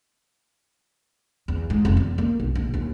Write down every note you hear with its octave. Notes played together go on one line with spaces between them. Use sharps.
E2
G#2
F1
E2
A#3
B1
A#1
D#2